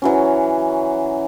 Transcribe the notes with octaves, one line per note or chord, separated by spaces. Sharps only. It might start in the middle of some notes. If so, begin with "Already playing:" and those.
E3 F#3 C#4